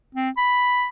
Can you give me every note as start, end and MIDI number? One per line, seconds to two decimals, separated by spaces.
0.15 0.29 60
0.37 0.87 83